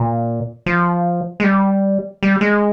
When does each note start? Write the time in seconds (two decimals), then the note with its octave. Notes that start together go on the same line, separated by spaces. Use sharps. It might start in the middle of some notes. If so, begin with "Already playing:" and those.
Already playing: A#2
0.66 F3
1.40 G#3
1.44 G3
2.23 G3
2.41 G#3